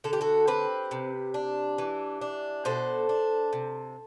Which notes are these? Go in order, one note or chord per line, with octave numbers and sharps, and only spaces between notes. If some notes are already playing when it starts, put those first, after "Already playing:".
D3 A4
G4
F#4 A4
C4 G4 B4
C3
D4
E3
D4
B2 A4 C5
D4
C3